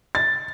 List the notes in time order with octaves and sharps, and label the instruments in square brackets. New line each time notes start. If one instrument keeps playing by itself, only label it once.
[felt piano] A6